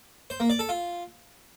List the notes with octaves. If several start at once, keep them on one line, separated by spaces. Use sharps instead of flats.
C5
A#3
D5
A4
F4